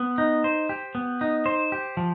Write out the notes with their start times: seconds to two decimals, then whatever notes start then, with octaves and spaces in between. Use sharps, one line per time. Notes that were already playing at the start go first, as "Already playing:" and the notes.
Already playing: B3
0.18 D#4
0.44 C5
0.69 G4
0.95 B3
1.21 D#4
1.46 C5
1.72 G4
1.97 F3